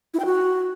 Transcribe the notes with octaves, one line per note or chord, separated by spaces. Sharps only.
E4
G5
F#4